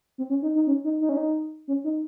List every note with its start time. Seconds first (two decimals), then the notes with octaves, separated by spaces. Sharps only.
0.18 C4
0.30 C#4
0.42 D#4
0.55 D#4
0.67 C#4
0.84 D#4
1.01 D#4
1.09 C#4
1.17 D#4
1.68 C#4
1.84 D#4